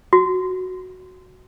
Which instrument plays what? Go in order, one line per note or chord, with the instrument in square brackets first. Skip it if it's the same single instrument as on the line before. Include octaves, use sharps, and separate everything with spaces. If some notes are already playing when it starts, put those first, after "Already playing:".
[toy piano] F#4